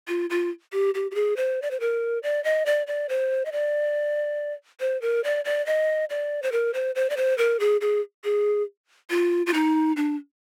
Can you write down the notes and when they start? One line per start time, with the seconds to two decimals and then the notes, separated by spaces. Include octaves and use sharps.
0.08 F4
0.30 F4
0.73 G4
0.95 G4
1.11 G4
1.15 G#4
1.37 C5
1.62 D5
1.71 C5
1.80 A#4
2.23 D5
2.44 D#5
2.66 D5
2.87 D5
3.09 C5
3.45 D#5
3.52 D5
4.80 C5
5.02 A#4
5.24 D5
5.45 D5
5.66 D#5
6.10 D5
6.43 C5
6.52 A#4
6.74 C5
6.95 C5
7.10 D5
7.17 C5
7.38 A#4
7.60 G#4
7.81 G#4
8.24 G#4
9.10 F4
9.46 F4
9.54 D#4
9.97 D4